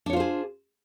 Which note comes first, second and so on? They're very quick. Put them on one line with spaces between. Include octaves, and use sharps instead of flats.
D4 C#5 F4 C5 G#4